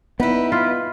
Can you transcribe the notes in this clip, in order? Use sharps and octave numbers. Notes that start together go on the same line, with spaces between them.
B3 D#4 E4 B4
F4